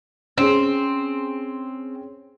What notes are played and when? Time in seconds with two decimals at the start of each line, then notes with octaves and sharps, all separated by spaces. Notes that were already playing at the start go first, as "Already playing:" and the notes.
0.38 C4 C#4 G#4